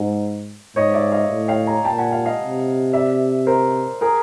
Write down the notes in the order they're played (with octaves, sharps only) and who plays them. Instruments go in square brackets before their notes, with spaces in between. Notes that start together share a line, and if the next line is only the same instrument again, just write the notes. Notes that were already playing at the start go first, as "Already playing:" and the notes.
Already playing: [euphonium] G#2
[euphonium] G#2 [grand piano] C#5 D#5
[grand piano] D5 E5
D#5 F5
[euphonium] A2
[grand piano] F5 G5
G#5 A#5
[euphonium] A#2 [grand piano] G5 A5
[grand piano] F#5 G#5
F5 G5
D#5 F5
[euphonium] C3
[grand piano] D5 E5
A#4 C5
G#4 A#4